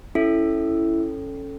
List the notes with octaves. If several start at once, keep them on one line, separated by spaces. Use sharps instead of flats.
C#4 E4 A4